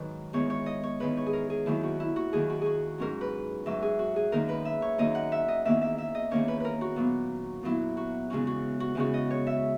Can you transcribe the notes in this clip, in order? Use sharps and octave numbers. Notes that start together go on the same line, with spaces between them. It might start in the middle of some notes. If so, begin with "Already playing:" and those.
Already playing: G#2 D#3 F#3 F#4 B4
E2 D#3 G#3 C#5
C#5
D#5
C#5
E2 D#3 G#3 B4
C#5
G#4
A#4
G#4
D#2 D#3 F#3 E4
F#4
E4
F#4
D#2 D#3 F#3 G#4
F#4
F#4 G#4
G#2 F#3 C#4 A#4
B4
G#2 F#3 C#4 E5
G#4
F#4
G#4
F#2 D#3 A#3 D#4 A#4
B4
E5
C#5
F#2 D#3 A#3 D#4 D#5
F#5
E5
D#5
E2 D#3 A#3 C#4 E5
E5
E5
D#5
E2 D#3 A#3 C#4 C#5
B4
A#4 B4
F#4
A#2 F#3 B3
A#2 F#3 B3 E4
F#4
E2 C#3 G#3 C#4 F#4
F#4
F#4
E2 C#3 G#3 C#4 F#4
D#5
C#5
E5